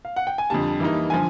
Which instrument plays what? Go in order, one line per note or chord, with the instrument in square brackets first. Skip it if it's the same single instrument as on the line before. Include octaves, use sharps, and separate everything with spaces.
[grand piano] F5
F#5
G5
G#5
[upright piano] F2 D3 G3 [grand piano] A5
[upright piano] E3 G3 A#3 D#4
[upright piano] D3 F3 [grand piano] G#5